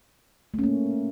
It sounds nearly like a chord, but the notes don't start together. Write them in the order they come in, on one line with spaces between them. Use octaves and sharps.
A3 C#4 A#3